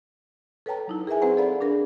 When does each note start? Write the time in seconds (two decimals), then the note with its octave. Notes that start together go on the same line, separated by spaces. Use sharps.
0.66 A4 B4 C#5 G5 A5 A#5
0.88 F#3 D#4 E4
1.07 G#4 A#4 B4 E5 G#5
1.21 C4 G#4 B4 C5 F#5 A#5
1.37 A4 B4 D5 F5 B5
1.60 D4 G#4 A#4